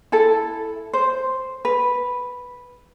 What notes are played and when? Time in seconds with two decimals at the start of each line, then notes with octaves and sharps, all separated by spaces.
0.12 E4 A4
0.93 C5
1.65 B4